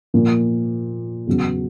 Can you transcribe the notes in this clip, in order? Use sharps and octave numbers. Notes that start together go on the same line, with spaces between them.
A#2 F3 A#3
E2 C#3 F#3 B3